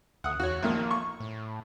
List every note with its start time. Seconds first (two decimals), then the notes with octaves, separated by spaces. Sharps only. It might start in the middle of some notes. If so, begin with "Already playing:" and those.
0.24 D2 F#5 D#6
0.40 E2 F#4 C#5
0.63 A#1 A#2 D#3 A#3
0.91 C#6
1.20 A2